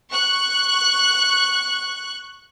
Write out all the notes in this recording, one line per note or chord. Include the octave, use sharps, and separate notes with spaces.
C#6 F#6